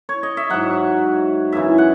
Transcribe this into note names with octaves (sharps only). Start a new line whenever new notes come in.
C#5
D#5
E5
G#2 F#3 F#5
F#2 C#3 E3 E5
F#5